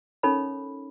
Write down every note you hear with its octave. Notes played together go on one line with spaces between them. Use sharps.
C#4 D#4 A4 A#4 C#5 B5